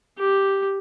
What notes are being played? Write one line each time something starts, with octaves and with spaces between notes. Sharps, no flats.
G4